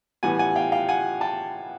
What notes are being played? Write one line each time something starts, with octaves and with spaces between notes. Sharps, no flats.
A2 E3 G3 B3 F#5 G#5
F#5 G#5
F5 G5
F5 G5
F#5 G#5
G5 A5